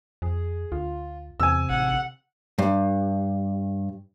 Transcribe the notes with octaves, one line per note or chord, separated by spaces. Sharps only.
F2 G#4
D2 F4
E2 C3 G#5 E6
A1 F#5
G2